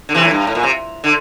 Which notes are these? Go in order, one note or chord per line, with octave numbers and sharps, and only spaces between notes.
D3
C3 E3
A2
G2
A2
A#2
C3
D3